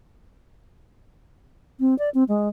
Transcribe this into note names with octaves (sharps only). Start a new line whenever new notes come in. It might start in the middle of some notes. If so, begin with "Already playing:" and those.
C4
D5
C4
G#3